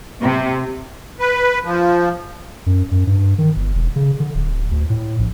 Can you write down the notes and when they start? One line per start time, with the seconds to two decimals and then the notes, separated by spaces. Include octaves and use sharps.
0.21 C3
1.20 B4
1.64 F3
2.66 F#2
2.91 F#2
3.07 G2
3.38 D#3
3.56 G1
3.75 E1
3.96 C#3
4.20 D3
4.35 D1
4.71 D2
4.90 A2
5.19 A#1